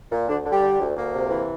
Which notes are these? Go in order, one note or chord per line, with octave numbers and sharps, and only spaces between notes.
A#2
D2 D3 D4
D3
G3 G4
D3
D2
D2 A#3
C3
E3